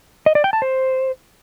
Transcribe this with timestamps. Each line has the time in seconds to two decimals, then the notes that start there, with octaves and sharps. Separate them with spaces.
0.26 D#5
0.35 D5
0.44 G5
0.53 A5
0.62 C5